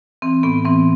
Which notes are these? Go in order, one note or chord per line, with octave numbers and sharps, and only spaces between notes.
E3 C4
A2 B3
E3 C4